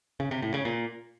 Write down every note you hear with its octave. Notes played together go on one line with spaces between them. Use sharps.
C#3
C3
A2
C#3
A#2